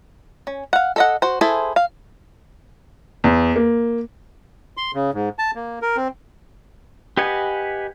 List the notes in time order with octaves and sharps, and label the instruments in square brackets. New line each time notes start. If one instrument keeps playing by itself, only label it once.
[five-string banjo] C#4
F5 F#5
A4 D#5 F#5
F#4 C5
E4 G#4 A4 C5
F5
[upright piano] E2
A#3
[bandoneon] C6
C#3
G#2
A5
A#3
A#4
C4
[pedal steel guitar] G4 B4 D#5 F#5 G#5